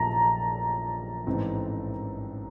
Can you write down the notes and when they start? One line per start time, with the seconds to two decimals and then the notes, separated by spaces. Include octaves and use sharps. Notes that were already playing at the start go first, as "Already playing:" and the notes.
Already playing: A#1 A#2 F3 A3 A5 A#5
1.27 A1 G#2 E3 A3 C4